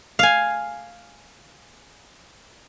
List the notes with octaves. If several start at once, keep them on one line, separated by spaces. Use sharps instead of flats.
F5 G#5